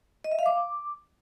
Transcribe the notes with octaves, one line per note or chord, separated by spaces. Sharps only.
D#5
E5
F5
D6